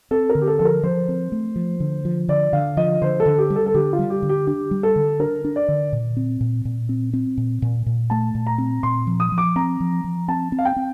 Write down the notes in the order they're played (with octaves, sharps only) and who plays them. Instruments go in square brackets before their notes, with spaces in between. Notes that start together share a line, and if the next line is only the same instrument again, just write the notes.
[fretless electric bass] C4 [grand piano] A4
[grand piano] A#4
[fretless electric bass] D3
[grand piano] G4
A4
[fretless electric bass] F3 [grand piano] A4
[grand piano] A#4
[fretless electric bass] F3 [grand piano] C5
[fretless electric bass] C4
A3
F3
D3
F3
[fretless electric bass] D3 [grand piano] D5
[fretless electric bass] D3 [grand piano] F5
[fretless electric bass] F3 [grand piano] D#5
[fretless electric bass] D3 [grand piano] C5
[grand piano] A4
[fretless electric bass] D3
[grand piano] G4
[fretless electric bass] G3
[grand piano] A4
A4
[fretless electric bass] D3 [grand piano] G4
[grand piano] F4
[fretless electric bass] G3
[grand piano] G4
[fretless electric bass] D3
[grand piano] G4
[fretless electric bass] D4 [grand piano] G4
[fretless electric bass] G3
[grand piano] A4
[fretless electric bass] D3
[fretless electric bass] D4 [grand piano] A#4
[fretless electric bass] D4
[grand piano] D5
[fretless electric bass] D3
A#2
C4
A#2
A#2
C4
C4
A#2
A#2
A#2
[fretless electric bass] A3 [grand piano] A5
[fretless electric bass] A#2
[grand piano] A#5
[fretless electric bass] C4
[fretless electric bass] A#2 [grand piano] C6
[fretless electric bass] F3
[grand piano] D#6
[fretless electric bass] F3
[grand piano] D6
[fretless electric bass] C4 [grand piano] A#5
[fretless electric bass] F3
F3
[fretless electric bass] C4 [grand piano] A5
[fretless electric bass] C4
[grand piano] F5
G5
[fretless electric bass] C4